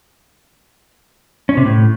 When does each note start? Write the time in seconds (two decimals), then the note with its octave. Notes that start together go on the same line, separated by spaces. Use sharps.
1.49 C#4
1.57 C3
1.65 A2